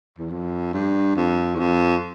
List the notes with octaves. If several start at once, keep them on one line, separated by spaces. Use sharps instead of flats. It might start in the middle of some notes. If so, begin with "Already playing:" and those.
E2
F2
G2
F2
E2
F2